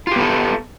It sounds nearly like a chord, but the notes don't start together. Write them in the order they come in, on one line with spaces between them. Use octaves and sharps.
F4 G4 B3 A4